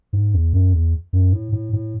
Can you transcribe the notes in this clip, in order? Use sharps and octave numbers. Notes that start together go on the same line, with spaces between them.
G#2
E2
F#2
E2
F#2
A2
A2
A2